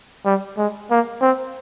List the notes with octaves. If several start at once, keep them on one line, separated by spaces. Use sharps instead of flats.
G3
G#3
A#3
C4